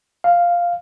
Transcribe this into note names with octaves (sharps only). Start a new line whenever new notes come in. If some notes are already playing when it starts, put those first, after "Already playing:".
F5